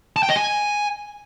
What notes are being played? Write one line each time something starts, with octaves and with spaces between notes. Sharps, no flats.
A5
G5
D#5
G#5